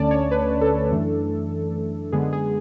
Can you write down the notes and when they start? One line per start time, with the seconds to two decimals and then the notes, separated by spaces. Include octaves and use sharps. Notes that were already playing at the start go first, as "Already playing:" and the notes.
Already playing: D2 D3 A3 C#4 D5 A5
0.11 C#5
0.31 B4
0.61 A4
0.91 F#2 E3 A3 D4
2.12 F#2 D3 G#3 B3 G#4
2.33 G#4